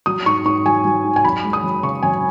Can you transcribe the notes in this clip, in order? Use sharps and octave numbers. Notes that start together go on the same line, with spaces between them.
F#3 D#6
G#2 C#6
G#2 C#6
F#3 G#5
F#3
G#2
G#5
F#2 B5
G#3
D#6
F#2
C#3 C#6
F#2 G#5